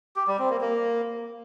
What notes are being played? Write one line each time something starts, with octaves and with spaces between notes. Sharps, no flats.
G4
G3
C4
A#3
A#3